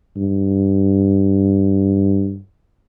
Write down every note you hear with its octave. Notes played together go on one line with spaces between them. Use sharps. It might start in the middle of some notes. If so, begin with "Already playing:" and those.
G2